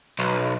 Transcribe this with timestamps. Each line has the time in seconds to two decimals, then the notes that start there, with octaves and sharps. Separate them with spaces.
0.19 B1